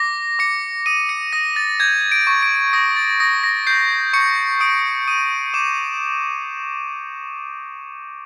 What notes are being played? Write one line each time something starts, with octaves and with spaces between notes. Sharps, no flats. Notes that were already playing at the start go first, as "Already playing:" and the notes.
Already playing: D6 A#6
D6 C#7
D#6 D#7
C#7
D#6 A#6
A6
G6 G#6
D7
C#6
D7
D#6 A#6
A6
D#6 A#6
A#6
G6 C7
C#6 C#7
D#6 D7
D#6 D#7
D6 E7